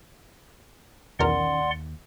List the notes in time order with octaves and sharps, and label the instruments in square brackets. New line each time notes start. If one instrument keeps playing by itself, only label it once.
[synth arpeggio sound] B1 E2 A#4 [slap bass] D#3 C#4 [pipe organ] D5 F#5 C6
[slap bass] D#2